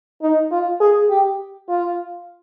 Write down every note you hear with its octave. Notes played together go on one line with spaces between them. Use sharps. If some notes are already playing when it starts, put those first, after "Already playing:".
D#4
F4
G#4
G4
F4